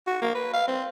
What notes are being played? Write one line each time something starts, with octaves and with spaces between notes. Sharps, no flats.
F#4
A#3
B4
F5
C4